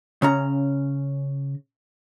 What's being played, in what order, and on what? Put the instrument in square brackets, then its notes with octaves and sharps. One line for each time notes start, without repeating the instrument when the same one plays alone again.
[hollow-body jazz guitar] C#3 C#4 A#5